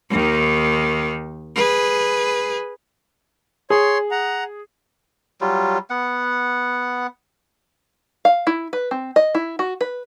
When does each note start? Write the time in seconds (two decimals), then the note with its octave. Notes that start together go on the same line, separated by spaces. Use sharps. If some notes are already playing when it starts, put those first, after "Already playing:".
0.11 D#2 D#3
1.55 G#4 B4
3.70 G#4 C#5 C6
4.11 F#5 A#5
5.41 F#3 G3 F4
5.90 B3 F#5
8.25 F5
8.47 E4
8.73 B4
8.91 C4
9.16 D#5
9.35 E4
9.59 F#4
9.81 B4